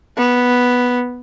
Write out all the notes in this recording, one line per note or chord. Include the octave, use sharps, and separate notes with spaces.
B3